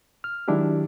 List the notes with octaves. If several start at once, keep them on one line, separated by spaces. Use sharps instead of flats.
F6
D#3 F#3 G#3 D4 E4 G4